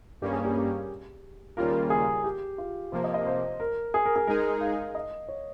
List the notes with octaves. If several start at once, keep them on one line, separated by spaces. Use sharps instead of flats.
G2 G3 A#3 C#4 G4
G#4
G4
G#4
D#2 C#3 G3 A#3 F4 A#4
G#4
G4
F4
C3 F3 A#3 C5
D#5
D#5
C5
A#4
G#4
A#4
G#4
G#3 D#4 G#4 A#4
F5
D#5
C#5